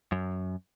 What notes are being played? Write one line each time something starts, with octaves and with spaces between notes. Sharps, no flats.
F#2